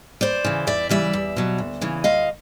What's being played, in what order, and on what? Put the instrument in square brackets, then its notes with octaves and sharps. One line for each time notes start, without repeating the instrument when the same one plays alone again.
[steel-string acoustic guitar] E2 C5 D5
C#3 E3
E2 D5 E5
C#3 E3 G3 D5 E5
E2
B2 F#3
D2
C#3 E3
D2 D#5 F5